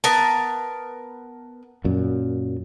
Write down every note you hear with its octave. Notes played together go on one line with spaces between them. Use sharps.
B3 A#4 A5
F#2 A#2